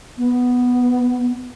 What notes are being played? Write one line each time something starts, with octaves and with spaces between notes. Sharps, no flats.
B3